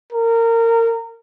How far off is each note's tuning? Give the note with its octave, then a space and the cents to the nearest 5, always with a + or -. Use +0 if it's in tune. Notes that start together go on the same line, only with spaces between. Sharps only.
A#4 -25